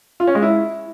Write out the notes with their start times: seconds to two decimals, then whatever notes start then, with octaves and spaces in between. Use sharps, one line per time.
0.20 F4
0.27 C#4
0.35 G#3
0.42 E4